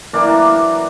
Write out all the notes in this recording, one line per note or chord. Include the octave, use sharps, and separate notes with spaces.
E3 F#3 A#3 D4